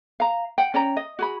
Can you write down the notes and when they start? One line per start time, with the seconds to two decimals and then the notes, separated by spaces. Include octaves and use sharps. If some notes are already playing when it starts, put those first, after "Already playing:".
0.20 F5 A#5
0.58 F#5 G5
0.74 C#4 D5 G5 A#5
0.97 D#5
1.19 F#4 G#4 B5